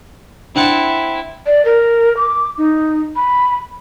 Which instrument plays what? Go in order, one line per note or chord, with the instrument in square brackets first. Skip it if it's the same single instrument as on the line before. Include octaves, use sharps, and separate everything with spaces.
[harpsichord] C4 F#5 A5 [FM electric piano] D4 [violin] E4
[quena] D5
A#4
D6
D#4
B5